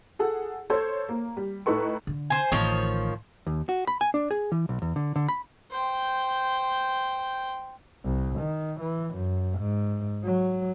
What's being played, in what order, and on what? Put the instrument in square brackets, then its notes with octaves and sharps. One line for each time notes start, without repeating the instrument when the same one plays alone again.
[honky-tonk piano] G#4 A4 F#5
A4 C5 C#5
A#3
G3
A2 D#4 A4 B4 C#6
[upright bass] D3
[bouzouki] C5 G#5
[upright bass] A1 [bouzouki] D#3 F3 C#5
[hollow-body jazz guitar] D#2
F#4
B5
G#5
D4
G#4
E3
B1
E2
D3
D3
B5
[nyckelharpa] C5 G5
[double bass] C2
D#3
E3
F#2
G#2
F#3